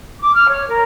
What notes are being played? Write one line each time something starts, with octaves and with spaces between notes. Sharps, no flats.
D6
F6
C#5
A#4